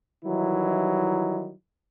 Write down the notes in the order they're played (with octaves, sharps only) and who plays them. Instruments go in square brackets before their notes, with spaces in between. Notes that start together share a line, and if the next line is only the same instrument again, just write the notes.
[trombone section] D#3 E3 F#3 G3 D#4 E4